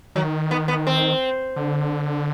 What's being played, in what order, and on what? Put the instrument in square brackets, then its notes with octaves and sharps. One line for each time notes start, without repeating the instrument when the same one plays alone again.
[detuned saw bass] D#3 [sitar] F#3
[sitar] B3
B3
C4
[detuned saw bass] D3